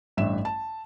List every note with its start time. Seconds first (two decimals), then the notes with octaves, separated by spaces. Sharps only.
0.17 A1 G2 E5 E7
0.45 A5